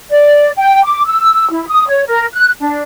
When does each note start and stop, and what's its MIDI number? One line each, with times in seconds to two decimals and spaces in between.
0.10 0.50 74
0.57 0.82 79
0.84 1.03 86
1.05 1.48 88
1.51 1.67 64
1.68 1.86 87
1.88 2.04 73
2.07 2.26 70
2.33 2.51 90
2.60 2.82 62